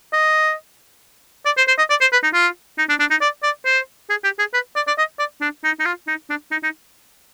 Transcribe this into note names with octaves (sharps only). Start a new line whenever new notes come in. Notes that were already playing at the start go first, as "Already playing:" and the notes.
D#5
D5
C5
C5
D#5
D5
C5
B4
D#4
F4
D#4
D4
D4
D#4
D5
D5
C5
G#4
G4
G#4
B4
D5
D5
D#5
D5
D4
D#4
D#4
F4
D#4
D4
D#4
D#4